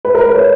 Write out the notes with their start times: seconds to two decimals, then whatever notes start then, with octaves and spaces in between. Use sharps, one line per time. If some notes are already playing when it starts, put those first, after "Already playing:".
0.05 B4
0.15 A#4
0.25 B4
0.35 C#5